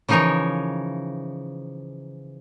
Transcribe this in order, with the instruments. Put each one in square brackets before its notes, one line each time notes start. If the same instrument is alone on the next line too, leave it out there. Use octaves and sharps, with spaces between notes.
[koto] C#3 E3 F3 D#4 A#4 C#5